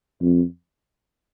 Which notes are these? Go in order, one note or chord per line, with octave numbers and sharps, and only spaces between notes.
F2